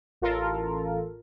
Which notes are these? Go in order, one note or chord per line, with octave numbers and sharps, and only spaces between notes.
A1 F4 A4 A#4